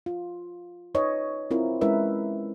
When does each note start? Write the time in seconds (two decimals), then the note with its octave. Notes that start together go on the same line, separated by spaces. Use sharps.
0.06 F4
0.95 D#4 B4 C#5 D#5
1.51 C4 E4 F4 A#4
1.81 G#3 C#4 E4 A#4 B4 E5